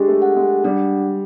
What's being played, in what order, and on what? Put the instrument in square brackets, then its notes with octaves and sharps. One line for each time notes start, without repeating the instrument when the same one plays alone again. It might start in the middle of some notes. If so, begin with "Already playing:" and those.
Already playing: [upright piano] G#3 D4 [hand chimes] G4
[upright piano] A3
[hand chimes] F#5
[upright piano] G#3
[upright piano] G3 [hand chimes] D4